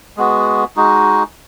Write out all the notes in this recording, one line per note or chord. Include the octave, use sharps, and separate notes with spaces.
G#3 B3 F#4
G#3 D#4 F#4